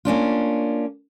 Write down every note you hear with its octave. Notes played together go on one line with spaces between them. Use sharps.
A#3 C#4 D4 F4